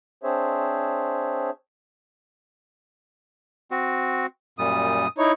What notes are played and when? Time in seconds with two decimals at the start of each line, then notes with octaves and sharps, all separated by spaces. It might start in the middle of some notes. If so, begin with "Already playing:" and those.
0.23 C4 D4 G#4 C5 C#5 E5
3.71 C4 F#4
4.58 F#2 A#2 G3 D#6
5.18 D#4 E4 C#5